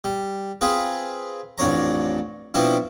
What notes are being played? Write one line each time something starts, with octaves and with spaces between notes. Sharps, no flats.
G3
C4 F4 G#4 B4
A1 F2 D4 C#5 A#5
B2 F3 C4 D4 E4